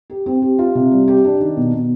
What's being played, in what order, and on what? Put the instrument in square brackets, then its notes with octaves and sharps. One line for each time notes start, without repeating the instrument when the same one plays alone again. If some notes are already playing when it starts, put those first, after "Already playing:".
[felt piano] G4
C4
G4
F4
C3
G3
G4
D4
D#3
B2
B2